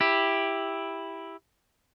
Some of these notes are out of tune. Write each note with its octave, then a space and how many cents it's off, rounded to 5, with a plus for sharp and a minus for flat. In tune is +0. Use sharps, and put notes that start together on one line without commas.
E4 +0 G4 +5